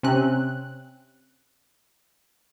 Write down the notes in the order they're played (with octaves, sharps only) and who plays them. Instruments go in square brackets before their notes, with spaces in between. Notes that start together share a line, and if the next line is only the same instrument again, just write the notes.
[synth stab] C3 C4 C#4 F#6